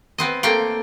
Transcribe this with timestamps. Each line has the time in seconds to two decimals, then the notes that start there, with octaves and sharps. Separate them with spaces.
0.18 B3 C4 D#5
0.43 A3 A#3 C4 G5